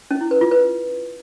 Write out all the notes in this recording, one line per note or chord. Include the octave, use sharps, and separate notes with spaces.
C#4
E4
B4
F4
B4